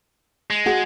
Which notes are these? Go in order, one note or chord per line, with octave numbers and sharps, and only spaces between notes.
G#3
F#4 G#4